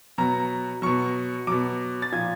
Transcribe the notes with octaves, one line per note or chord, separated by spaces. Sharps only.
B2 F#3 A#5
B2 F#3 C#6
B2 F#3 D6
A6
A#2 F3 G#6